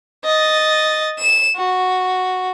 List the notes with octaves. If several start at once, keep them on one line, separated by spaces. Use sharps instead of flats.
D#5 A6
E7
F#4